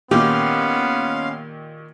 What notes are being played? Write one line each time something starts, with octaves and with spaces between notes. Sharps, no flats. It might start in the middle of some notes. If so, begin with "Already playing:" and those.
A#2 D#3 B3 C#4 G4 F5 C6